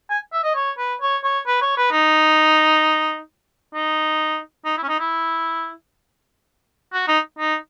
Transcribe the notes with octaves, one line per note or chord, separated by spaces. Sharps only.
G#5
E5
D#5
C#5
B4
C#5
C#5
B4
C#5
B4
D#4
D#4
D#4
E4
C#4
D#4
E4
F#4
D#4
D#4